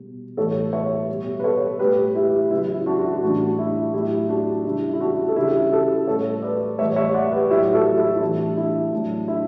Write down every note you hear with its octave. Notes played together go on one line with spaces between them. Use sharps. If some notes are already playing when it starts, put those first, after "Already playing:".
Already playing: B2 G3
A2 E3 G3 A4 C#5
C#5 E5
B2 G3
B4
A4 C#5
A2 G3 G4 B4
E4 G4
C#3 F#3 E4
E4
D4 F#4
F#4
E4
A2 E3 G3 D4 F#4
E4
A2 F#3 E4 G4
D4 F#4
C#3 G3 E4
E4
D4 F#4
A4
C#3 G3 E4 G4
F#4 A4
A2 G3 A4 C#5
B4 D5
A2 E3 G3 C#5 E5
C#5 E5
D5 F#5
G4 B4
A2 F#3 E4 G4
F#4 A4
E4
E4
A2 E3 G3 D4
E4
A2 F#3 D4
E4